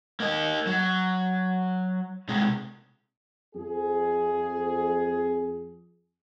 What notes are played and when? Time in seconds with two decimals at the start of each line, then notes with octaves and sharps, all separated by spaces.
0.20 A#3 D#5
0.67 F#3
2.28 C3 G#3
3.55 F2 G#4